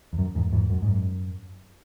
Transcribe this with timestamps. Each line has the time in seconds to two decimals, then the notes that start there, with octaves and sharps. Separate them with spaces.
0.13 E2
0.18 F#2
0.35 E2 G#2
0.53 E2 G#2
0.70 F#2
0.82 G#2
0.88 F#2